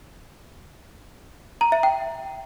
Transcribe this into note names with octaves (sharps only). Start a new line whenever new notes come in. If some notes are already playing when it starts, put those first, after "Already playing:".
A#5
E5
G5